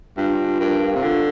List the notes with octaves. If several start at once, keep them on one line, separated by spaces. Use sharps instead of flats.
G2 F4
F4
G2 A#4
F5
C3
D3 F4